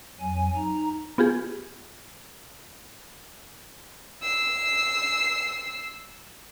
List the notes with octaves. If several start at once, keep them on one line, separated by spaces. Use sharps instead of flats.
F2 F#3 G#5
D#4 A#5
B3 F4 G4 G#4
E6 C7